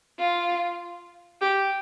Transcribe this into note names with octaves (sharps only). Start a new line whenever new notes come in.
F4
G4